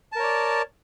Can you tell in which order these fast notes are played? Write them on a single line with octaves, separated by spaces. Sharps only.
A5 A#4 C#5 D5